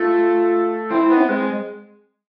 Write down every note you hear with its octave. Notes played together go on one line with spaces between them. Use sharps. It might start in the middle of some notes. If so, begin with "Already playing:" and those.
Already playing: A3 F4
C4 E4
B3
C4
G#3